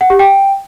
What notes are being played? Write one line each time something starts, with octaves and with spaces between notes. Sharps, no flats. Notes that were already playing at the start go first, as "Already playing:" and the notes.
F#5
G4
G5